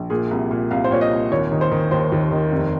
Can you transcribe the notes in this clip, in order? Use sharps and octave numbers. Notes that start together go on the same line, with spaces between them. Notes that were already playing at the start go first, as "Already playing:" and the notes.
Already playing: A#1
A#2 G#4
C2
A#2
C2 F5
C5
A#2 C#5
D#5
C2
D#2 C#5
D#3
C5
D#3
D#2 C5
D#2
D#3
F1